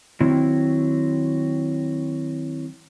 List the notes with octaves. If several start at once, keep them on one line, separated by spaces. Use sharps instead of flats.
D#3 F#3 C4 E4